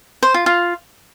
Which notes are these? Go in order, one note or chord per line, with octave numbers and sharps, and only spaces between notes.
C5
F4
F4